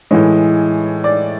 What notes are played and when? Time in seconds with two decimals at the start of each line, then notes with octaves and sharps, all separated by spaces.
0.11 A2 E3 G#3 C#5
1.04 D5